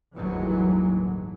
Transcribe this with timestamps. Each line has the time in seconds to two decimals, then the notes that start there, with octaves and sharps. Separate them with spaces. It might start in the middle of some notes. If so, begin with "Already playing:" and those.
0.15 G1 D#2 A2 E3 F#3 G#3